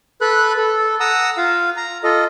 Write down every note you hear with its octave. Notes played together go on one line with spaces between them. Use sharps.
A4 B4 B5 F#6
A4
F#5 A#5 D#6 E6
F4 F5
A#5
F4 A4 D#5